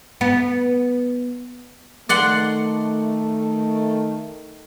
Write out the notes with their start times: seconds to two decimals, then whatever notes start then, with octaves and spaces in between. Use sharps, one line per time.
0.21 B3
2.09 D#3 A3 D5 F#5 C6